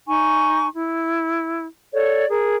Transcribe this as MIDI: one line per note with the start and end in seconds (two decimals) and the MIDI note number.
0.07 0.68 63
0.07 0.68 80
0.07 0.68 85
0.75 1.66 64
1.92 2.27 69
1.92 2.27 73
1.92 2.27 74
2.28 2.55 68
2.28 2.55 70